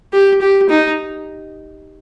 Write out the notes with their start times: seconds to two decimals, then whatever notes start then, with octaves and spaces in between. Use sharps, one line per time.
0.13 G4
0.42 G4
0.70 D#4